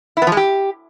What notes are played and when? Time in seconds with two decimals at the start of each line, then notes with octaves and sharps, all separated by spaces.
0.17 E4
0.22 B3
0.27 F3
0.32 G#3
0.37 G4